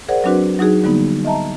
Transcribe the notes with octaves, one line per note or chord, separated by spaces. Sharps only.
G#4 A#4 C5 D5 F#5
F#3 C4 D4 F#4 B4
F#3 D#4 F#4 G#4
D3 G3 A#3 B3 D#4
D#5 E5 A5 A#5